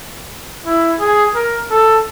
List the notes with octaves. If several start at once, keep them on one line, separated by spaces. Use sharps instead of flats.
E4
G#4
A#4
A4